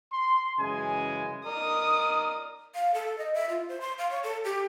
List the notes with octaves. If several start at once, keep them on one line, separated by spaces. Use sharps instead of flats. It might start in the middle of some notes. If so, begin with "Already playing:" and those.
C6
F#2 C#3 E3 G#3 G#5
A#4 D5 D#5 D#6
F5
A4
D#5
E5
F4
C5
C6
F5
C#5
A4
G4